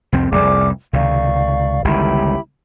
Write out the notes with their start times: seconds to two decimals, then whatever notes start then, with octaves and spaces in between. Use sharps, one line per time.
0.12 C2 F2 C4
0.32 F1 C2 F2 G#4 D5 D6
0.93 C#2 C3 D#3 D5 F5 C#6
1.84 G1 C#2 D#3 E4 G4 B5